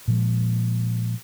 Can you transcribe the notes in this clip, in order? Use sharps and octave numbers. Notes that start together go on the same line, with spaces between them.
A#2 F3 G#3